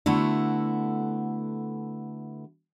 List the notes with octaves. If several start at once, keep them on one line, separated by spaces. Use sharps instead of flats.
D3 A3 B3 E4 F#4